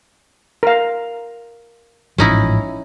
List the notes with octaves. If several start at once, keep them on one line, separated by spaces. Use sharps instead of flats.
A#4 F5
A1 G#2 F3 C#4 D#4 E4